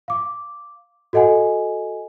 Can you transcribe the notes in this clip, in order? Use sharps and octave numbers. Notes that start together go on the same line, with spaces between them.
F5 D6
F#4 A4 D#5 F#5 G#5